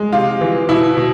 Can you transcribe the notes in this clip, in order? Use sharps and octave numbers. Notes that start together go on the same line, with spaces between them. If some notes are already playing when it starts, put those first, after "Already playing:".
Already playing: G#3
C3 F4
E3
B2 E4
B2